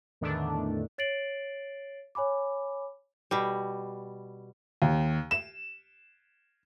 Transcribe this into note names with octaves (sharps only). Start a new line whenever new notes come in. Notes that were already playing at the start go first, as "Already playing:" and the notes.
E2 A2 D3 D#3 A3 D4
C#5 A6 C7 D7 F#7
C#5 G#5 B5 D6
B2 G3
D#2
E7